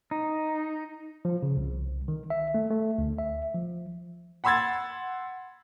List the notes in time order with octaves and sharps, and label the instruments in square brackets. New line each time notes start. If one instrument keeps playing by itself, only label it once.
[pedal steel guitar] D#4
[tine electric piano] F3
C#3
C2
D#3
E5
A3
A3
D2
E5
F3
[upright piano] F#5 B5 C6 E6 G#6 A6